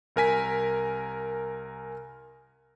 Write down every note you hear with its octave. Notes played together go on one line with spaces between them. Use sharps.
C2 A#4 G#5 B6